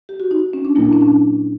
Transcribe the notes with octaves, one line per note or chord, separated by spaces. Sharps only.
G4
F#4
D#4
C#4
D4
A#2 F#3 A#3 E4
D4
C#4
D4